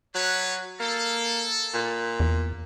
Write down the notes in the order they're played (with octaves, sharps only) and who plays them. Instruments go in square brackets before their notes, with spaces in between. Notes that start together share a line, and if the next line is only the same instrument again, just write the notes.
[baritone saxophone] F#3 [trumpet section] B4 C#5
[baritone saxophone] A#3 [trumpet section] A4
[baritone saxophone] A#2
[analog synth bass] E2